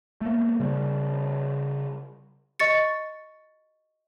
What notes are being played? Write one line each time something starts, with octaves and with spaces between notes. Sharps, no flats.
A3 A#3
C#3 G3
D#5 C#6 A6 C#7